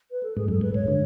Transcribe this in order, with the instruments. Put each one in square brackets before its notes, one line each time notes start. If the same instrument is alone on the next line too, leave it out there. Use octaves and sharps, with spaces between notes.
[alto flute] B4
A4
[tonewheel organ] G#2 [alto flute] G#4
[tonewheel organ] F#2 [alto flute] A4
[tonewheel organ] G#2 [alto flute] B4
[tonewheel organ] G#2 [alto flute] C#5
[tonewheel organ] D3